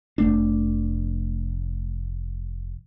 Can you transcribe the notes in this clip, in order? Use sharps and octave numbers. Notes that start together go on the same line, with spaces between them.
F1 A3 D4